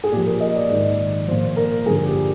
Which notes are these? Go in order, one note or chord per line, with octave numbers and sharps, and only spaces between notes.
G#4
A#2 F3 G4
A#4
D#5
D5
G#2 D#3
A#2 F3 C5
A#4
G2 D3 F3 G#4
G4